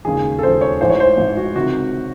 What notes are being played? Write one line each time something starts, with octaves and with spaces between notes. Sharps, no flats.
E1 D#2 C#3 G#4
A4
E1 D#2 C#3 C5
C#5
A1 G#2 E3 C5
C#5
C5
A1 G#2 E3
F#4
C#2 C3 D#3 F#4